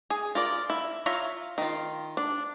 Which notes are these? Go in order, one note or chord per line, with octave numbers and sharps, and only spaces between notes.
G#4
F4 A#4 D5
E4
F4 C#5 E5 A#5
D#3 F4
D4